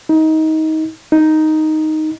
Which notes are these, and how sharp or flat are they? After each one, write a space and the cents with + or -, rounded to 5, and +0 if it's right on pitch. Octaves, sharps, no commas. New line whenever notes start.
D#4 +20
D#4 +0